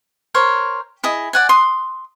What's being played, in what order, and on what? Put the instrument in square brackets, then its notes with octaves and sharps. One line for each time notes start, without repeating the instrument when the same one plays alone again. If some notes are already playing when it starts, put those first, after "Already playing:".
[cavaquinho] A#4 C5 C#5
E4 G#4 D#5
D5 F#5 G#5
C6 D#6